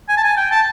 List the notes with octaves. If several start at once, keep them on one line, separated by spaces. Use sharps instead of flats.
G#5
A5
G#5
G5
A5